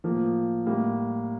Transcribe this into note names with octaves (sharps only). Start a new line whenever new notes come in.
A2 F3 A#3
A2 G3 A#3